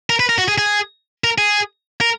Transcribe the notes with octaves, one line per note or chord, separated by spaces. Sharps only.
A#4
B4
A#4
F#4
G#4
G#4
A#4
G#4
A#4